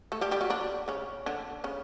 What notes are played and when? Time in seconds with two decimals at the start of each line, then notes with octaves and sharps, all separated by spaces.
0.12 A3 A4
0.21 G3 G4
0.31 G3 G4
0.41 F#3 F#4
0.50 D3 D4
0.88 C#3 C#4
1.26 D3 D4
1.64 C#3 C#4